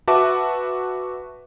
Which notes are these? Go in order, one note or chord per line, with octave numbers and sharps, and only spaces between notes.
F#4 B4 E5 A5 D6